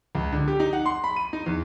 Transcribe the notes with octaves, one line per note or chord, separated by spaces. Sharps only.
C#2
D3
G4
D#4
F#5
C6
B5
D#7
D#4
E2